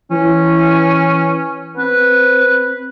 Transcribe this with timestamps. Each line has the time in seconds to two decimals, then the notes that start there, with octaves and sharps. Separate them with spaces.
0.11 E3 C#4
1.78 C4 B4